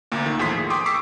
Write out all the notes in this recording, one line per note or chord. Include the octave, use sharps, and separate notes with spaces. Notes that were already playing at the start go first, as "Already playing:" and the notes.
D2 A#2 A#3
D#3
E2 A2 F3 C6 B6
G#4
G5 C6 D6 D#6
C#6 D6 E6 B6 C7